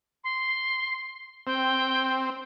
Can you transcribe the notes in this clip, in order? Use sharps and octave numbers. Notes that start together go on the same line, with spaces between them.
C6
C4 G5